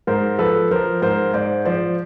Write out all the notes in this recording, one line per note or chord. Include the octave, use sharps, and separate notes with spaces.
G#2 A#4 C5
F3 A4 B4
F3 A#4 C5
G#2 A#4 C5
G#2 C5 D5
F3 C5 D5